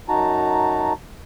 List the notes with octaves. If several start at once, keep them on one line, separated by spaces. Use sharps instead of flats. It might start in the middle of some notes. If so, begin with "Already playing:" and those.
F#2 D#4 F#4 A5 A#5